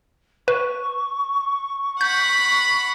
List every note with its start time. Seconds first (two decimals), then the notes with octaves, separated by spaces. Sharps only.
0.48 B4 C#6
2.01 F#5 B5 G6